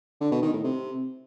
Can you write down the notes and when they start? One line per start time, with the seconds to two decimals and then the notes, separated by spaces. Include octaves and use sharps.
0.21 D3
0.32 B2
0.42 D#3
0.53 A2
0.64 C3